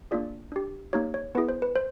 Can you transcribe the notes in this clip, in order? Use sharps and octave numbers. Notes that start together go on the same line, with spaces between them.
A#3 D4 F4 G#4 D5
D4 G4
A#3 D#4 G4 C#5
C#5
B3 E4 G#4 B4
C5
B4
C5